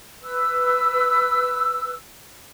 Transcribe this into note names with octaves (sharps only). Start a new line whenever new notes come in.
B4 E6